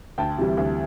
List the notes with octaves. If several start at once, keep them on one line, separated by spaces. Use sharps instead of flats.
D2 G5 A5
C3 E3 G3
D2